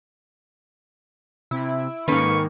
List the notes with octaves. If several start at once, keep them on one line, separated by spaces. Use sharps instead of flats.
C3 E4 D7
G#2 D#3 A#3 C#4 A4 B4 C#6